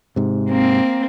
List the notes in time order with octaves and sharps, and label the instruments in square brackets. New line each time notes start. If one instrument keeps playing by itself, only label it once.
[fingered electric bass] G#2 C3
[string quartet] A#3 C4